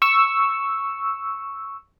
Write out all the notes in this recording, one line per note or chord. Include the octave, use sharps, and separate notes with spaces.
C#6 E6